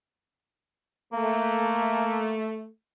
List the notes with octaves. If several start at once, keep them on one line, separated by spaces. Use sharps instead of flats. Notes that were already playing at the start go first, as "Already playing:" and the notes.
A3 A#3